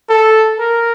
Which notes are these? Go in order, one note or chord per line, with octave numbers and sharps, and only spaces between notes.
A4
A#4